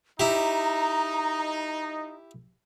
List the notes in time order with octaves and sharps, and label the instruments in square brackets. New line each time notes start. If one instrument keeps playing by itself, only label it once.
[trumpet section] D#4 [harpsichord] E4 G4 [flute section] A#5